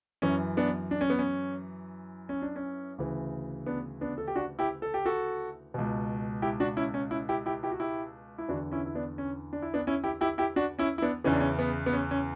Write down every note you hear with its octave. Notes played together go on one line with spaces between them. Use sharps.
F#2 E3 C#4
B3 D4
D4
C#4
B3
C#4
C#4
D4
C#4
D2 C#3 E3
B3 D4
B3 D4
A4
G4
D4 F#4
E4 G4
A4
G4
F#4 A4
C#2 B2
E4 G4
D4 F#4
C#4 E4
C#4
C#4 E4
E4 G4
E4 G4
E4 G4
F#4
E4 G4
E4
E2 D3 D4 F#4
C#4 E4
E4
B3 D4
C#4
D4
E4
B3 D4
C#4 E4
E4 G4
E4 G4
E4 G4
D4 F#4
C#4 E4
E4
B3 D4
E2 C#3 E3 C#4
D4
C#4
B3
B3
C#4
C#4